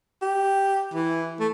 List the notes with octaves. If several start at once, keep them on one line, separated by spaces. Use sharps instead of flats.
G4
E3
A3